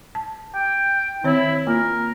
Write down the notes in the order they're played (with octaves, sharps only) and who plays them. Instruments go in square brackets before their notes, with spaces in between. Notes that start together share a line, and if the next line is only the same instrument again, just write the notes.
[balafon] A5
[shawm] G5
[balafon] D#3 C4 C#5 [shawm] E4
[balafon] A#3 F4 [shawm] A#4